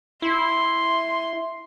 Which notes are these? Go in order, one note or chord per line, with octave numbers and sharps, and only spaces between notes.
E4 C6